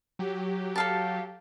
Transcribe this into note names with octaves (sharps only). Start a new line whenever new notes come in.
F#3 G4
A4 F5 A5